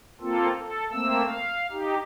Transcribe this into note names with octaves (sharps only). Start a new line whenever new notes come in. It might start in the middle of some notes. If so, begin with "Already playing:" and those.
A#3 C4 F4 A4
A4
A3 A#3 C4 E6
F5
D#4 G4